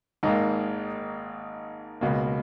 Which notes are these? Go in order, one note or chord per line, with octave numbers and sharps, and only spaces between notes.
G#1 G#2 D#3 A#3 D#4
C#2 B2 A#3